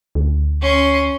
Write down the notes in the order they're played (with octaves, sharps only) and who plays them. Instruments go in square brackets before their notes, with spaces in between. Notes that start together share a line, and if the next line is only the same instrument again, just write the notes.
[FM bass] D2
[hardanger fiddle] C#4 C6